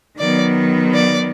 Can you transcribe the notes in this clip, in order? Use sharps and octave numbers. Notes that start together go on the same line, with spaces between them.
D#3 F#3 B3 D5
D5